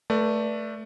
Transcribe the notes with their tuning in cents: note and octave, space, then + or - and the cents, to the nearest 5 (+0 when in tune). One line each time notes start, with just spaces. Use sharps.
A3 +5 B4 -30 D5 +0